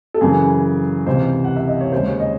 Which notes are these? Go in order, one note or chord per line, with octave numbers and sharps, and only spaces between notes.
A4
F#2 C#3 E3 G#4
C#2 C3 E3 C5
F#5
E5
D#5
C#5
D#2 C#3 G#3 C5
C#5
D#5